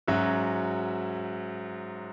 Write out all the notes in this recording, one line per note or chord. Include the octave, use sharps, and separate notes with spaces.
G#2 F#3 C#4 F#4 E5